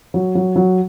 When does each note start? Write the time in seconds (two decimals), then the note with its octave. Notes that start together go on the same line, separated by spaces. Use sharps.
0.14 F#3
0.35 F#3
0.56 F#3